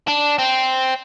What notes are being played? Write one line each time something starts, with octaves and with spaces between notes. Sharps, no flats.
D4
C4